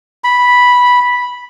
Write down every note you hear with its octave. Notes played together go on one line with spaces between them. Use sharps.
B5